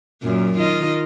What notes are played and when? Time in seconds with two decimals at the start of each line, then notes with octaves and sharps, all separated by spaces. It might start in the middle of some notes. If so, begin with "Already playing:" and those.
0.23 F#2 A#2
0.58 D#3 F4 D#5